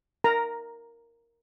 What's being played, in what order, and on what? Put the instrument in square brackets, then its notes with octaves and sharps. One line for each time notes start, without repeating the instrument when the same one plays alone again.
[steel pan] A#4 A#5